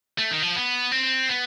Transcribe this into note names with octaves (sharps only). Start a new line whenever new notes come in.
A3
D#3
F3
B3
C4
B3